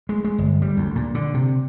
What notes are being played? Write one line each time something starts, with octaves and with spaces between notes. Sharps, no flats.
G#3
G#3
G1
G3
D2
A#2
D3
C3